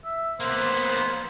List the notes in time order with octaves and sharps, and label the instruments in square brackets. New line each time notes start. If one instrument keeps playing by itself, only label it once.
[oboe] E5
[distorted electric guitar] A#3 B3 [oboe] C5